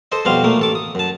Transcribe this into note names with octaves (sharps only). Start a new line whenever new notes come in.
A4 C5 D#5
F2 B2 G3 C5 F5
A#2 A3 A#3
A1 A4 D6
D#6
F#2 A5